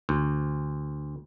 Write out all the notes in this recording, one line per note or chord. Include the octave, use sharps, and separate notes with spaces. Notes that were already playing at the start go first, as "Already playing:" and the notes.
D2